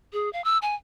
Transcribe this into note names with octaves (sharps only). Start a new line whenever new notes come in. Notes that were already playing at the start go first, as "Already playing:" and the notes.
G#4
F5
E6
G#5